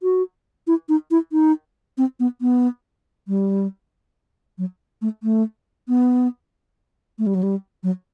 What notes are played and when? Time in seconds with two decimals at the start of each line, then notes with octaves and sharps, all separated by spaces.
0.03 F#4
0.67 E4
0.89 D#4
1.11 E4
1.32 D#4
1.98 C4
2.20 B3
2.41 B3
3.28 G3
4.58 F#3
5.02 A3
5.23 A3
5.88 B3
7.19 A3
7.26 G3
7.35 F#3
7.43 G3
7.83 F#3